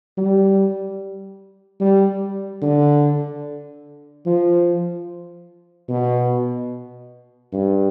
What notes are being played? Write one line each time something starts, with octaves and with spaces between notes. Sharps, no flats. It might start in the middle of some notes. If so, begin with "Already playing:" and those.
G3
G3
D3
F3
B2
G2